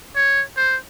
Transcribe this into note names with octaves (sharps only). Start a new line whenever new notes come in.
C#5
C5